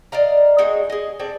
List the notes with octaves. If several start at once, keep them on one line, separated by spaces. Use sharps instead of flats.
D5 D#5 F5 A#5
G#3 D#4 F#4 G#4
G#4 D#5
C4 G#4 A4 D5